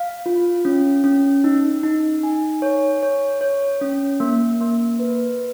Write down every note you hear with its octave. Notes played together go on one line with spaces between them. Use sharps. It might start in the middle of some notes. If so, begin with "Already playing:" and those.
Already playing: F5
F4
C#4
C#4
D#4
D#4
G#5
C#5
C#5
C#5
C#4
A#3
A#3
B4